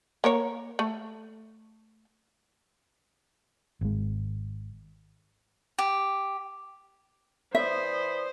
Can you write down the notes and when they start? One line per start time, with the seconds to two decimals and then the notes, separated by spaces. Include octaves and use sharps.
0.24 A#3 A#4 C#5
0.79 A3
3.81 G#1 G#3
5.79 G4
7.55 E3 C5 D5 E5 B5 D#6